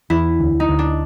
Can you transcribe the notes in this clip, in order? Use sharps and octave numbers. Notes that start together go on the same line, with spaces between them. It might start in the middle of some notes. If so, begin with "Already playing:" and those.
E2 E4
D2
D#4
D2
D4